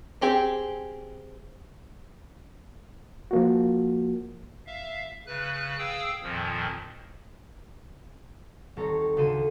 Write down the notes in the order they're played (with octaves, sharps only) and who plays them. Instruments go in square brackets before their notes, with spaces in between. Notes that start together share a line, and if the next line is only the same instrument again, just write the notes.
[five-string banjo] C4 G4 G#4
[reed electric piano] F3 A#3 F#4
[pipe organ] E5 F5
C#3 B4 F#6
G#4 F5 G5 D#6 E6
F2 A#2 D#3 F3
[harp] D#1 C4 A4 C#5 A#5
D2 C#3 A4 C5 D#7